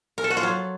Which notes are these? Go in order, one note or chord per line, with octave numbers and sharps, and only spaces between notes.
A#4
A4
F#4
F4
F#3